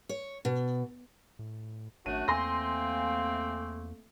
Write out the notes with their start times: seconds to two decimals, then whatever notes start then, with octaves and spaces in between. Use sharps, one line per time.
0.09 C#5
0.45 B2
1.39 A2
2.06 G#1 F#2 A3 D4 F#4 D#7
2.28 E2 A3 A#3 C4 G#5 C6 A#6